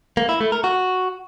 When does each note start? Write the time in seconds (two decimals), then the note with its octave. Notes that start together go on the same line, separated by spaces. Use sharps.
0.17 A#3
0.29 E4
0.41 A3
0.52 A#4
0.64 F#4